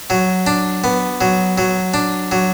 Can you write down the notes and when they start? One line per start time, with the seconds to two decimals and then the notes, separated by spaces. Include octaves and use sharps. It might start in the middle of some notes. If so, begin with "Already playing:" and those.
0.10 F#3
0.47 D4
0.84 B3
1.21 F#3
1.58 F#3
1.94 D4
2.31 F#3